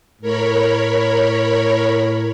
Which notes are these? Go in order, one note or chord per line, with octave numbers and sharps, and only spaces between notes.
A2 A#4 C#5 B5